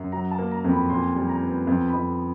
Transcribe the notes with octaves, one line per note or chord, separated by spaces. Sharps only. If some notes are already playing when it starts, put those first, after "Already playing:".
Already playing: F#2
F#3 A#5
A5
A#3
A#5
F2
B5
A#2 C6
G3
A#5
B3
F2
B5
F2